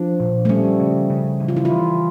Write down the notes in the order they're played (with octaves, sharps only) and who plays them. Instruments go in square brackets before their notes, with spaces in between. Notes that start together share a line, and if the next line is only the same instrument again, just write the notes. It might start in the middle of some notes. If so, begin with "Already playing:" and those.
Already playing: [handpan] F3 [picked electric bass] D4
[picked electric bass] A#2
[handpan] A3
[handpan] G3 [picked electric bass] C#4
[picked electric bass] C#3
C#3
E3
[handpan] F4
E4
[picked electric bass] E3 [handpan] F4